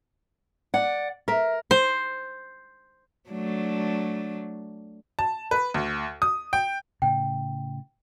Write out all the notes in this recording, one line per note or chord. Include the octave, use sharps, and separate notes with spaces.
D5 F#5
A#4 E5
C5
F#3 A3 D4
A5
B4
D2
D#6
G5
A2 C#3 G5